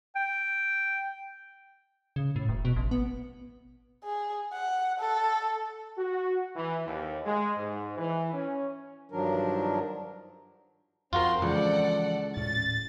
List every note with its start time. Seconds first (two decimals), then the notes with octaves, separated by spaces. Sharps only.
0.15 G5
2.16 C#3
2.36 A2
2.49 E1
2.65 B2
2.76 A1
2.91 B3
4.04 G#4
4.53 F#5
5.00 A4
5.98 F#4
6.56 E3
6.86 D#2
7.26 G#3
7.57 G#2
7.98 E3
8.33 C#4
9.11 G2 D#3 F3 F#3 D4 A#4
11.13 F2 C4 F4 F#4 A#4 C6
11.42 C#2 E3 F3 A4 D5 F#5
12.37 D#1 A2 C#4 A6